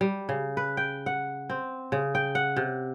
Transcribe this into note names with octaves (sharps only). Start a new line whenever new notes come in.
G3
C#3
B4
G5
F#5
C4
C#3
G5
F#5
C3